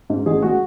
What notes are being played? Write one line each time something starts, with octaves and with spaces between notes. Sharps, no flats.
G#2
A1 G#4
G#3 F#4